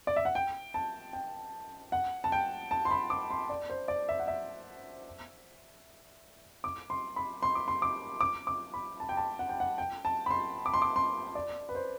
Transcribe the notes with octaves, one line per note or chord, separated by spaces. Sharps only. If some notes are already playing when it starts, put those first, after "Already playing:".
D5
E5
F#5
G5
A5
G5
F#5
A5
G5
A5
C6
B5
D6
C6
D5
C5
D5
E5
F#5
E5
D6
C6
B5
C6
D6
C6
D6
D6
D6
B5
A5
G5
A5
F#5
G5
F#5
G5
A5
B5
C6
D6
C6
D6
C6
D5
B4
C5